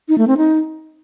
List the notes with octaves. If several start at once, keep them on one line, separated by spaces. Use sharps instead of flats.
D#4
A3
C4
D#4